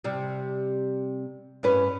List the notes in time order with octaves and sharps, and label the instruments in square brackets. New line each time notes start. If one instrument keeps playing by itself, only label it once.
[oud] C3 G3
G2 C#4 B4